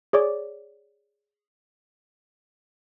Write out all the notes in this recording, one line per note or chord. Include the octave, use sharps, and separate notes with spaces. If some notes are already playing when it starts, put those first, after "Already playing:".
G#4 C#5 D5 D6